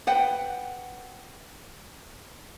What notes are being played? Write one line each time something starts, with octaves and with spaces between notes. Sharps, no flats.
B4 F#5 G5